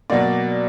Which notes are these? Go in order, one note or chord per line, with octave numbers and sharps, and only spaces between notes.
B2 F#3 A#3 D5